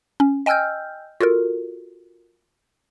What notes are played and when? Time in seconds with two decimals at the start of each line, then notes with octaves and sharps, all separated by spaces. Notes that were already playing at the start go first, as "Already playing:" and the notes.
0.20 C#4
0.46 D#5 G5 G#5 E6 F6 G6
1.21 F4 F#4 A4 A#4